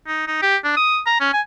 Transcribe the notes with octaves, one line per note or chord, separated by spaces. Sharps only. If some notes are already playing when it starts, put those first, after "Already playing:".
D#4
D#4
G4
D4
D#6
A#5
C#4
G#5